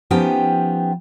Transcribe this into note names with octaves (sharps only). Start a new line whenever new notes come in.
F3 B3 C#4 D#4 G4 G5